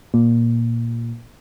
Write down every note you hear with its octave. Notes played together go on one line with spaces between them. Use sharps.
A#2